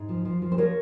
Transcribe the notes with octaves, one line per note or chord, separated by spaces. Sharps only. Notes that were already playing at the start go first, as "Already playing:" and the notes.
Already playing: G#2
F3
F3
F3
C5
F3 A#4 C#5